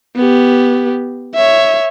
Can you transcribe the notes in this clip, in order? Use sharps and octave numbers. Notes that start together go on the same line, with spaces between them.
B3 G4
C#5 E5